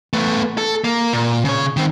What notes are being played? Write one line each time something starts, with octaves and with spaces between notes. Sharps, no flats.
A3 B3
A4
A#3
A#2
C#3 C#5
D#3 C4